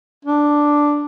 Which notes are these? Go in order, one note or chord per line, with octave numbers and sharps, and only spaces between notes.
D4